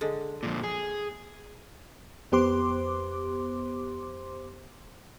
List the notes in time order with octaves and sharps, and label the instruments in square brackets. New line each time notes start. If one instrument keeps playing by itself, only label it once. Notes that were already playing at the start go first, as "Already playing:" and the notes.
[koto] D3 G#3
[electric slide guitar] F2 A#2
G#4
[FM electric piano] F2 B3 G4 C5 C6 D6